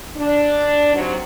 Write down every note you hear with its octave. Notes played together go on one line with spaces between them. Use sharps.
D4
G#2 C3 F#3